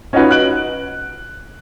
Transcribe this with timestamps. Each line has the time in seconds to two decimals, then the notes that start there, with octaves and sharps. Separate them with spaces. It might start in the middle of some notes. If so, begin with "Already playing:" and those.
0.13 C#4 D#4 F4 F#4 B4
0.31 F#6 D7 F#7